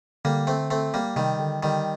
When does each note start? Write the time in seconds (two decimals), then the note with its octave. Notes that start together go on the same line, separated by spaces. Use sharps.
0.25 D3 G3 A#3
0.47 A3 C4
0.70 A3 C4
0.94 G3 A#3
1.16 C3 D#3 G3
1.39 D3
1.63 D3 D#3 G3